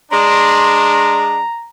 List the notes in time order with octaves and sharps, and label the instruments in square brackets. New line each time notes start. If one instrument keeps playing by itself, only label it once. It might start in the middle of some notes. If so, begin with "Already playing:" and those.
[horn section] G#3 D4 [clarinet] A#5 [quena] C6